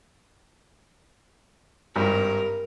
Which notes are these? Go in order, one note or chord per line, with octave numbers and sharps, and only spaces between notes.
G#1 G2 A#4